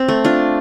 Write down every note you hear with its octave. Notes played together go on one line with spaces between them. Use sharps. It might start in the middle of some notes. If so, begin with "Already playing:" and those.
Already playing: C4
A3
D4 F4